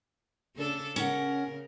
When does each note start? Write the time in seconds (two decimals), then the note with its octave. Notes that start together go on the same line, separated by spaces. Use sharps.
0.56 C#3 D4 A4
0.96 C#3 C#4 A#4 F#5